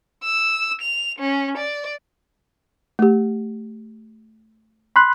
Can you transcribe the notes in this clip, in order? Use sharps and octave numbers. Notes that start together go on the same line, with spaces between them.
E6
F7
C#4
D5
A3 G4
B5 C6 F#6